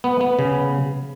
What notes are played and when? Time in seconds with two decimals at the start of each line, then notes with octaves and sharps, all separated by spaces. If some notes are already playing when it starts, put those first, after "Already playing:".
0.04 B3
0.21 B3
0.39 C#3